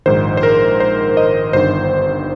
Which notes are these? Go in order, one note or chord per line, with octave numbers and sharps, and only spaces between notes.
A#1 G#2 D#3 C5
C5
A#4
C5
D#5
G1 G2 D#3 C5